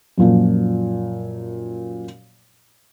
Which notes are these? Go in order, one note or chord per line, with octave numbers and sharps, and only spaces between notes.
F#2 A#2 F3